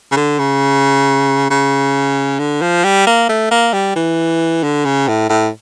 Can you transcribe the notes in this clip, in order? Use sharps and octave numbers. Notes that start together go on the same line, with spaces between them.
C#3
D3
C#3
C#3
D3
F3
G3
A#3
A3
A#3
G3
E3
D3
C#3
A2
A2